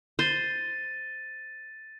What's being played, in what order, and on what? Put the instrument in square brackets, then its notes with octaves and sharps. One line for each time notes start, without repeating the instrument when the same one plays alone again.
[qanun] C5 [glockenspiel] A6 D#7